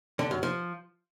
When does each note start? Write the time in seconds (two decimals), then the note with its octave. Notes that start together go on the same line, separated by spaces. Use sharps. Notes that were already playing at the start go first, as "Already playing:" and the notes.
0.19 D3
0.31 F#2
0.43 F3